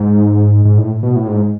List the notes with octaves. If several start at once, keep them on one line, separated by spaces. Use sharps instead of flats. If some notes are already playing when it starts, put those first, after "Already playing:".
Already playing: G#2
G#2
A2
B2
A2
G#2